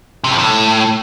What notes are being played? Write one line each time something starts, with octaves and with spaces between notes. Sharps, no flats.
C3
F2
A2